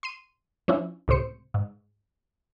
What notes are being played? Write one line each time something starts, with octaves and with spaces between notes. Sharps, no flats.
C6 C7 D#7
F3 C#4 D4 E4 F4
C#2 A2 C3 C5 C#7
G#2